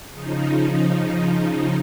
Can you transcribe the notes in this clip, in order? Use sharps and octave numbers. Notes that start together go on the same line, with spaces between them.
C#3 F3 D#4